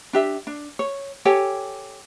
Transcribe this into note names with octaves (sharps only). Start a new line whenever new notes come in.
D4 G4 E5
D4
C#5
G4 A4 C#5 G#5